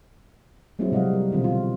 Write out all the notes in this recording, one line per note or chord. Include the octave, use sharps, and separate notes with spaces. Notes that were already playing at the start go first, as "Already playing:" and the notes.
F#3 G#3 A#3 C4 E4 F#4
C3 G3 D#5 F5 F#5
A#4
B2 D3 E3 G3 C4 F4
F4